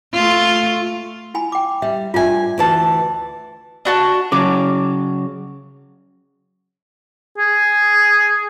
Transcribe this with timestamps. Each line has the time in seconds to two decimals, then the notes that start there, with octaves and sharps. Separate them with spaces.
0.14 A3 F4
1.34 E4 G#5 B5
1.52 G5 D6
1.82 G3 E5
2.14 G2 F4 E5 G#5
2.58 D2 E3 A5
3.85 D4 F#4 A5
4.32 C#3 F#3 D6
7.38 G#4